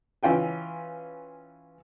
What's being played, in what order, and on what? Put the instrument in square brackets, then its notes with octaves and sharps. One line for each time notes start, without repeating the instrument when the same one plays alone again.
[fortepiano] E3 C#4 F4 G5 G#5